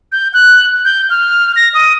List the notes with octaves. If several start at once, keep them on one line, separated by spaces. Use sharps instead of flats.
G6
F#6
G6
F6
A#6
D#6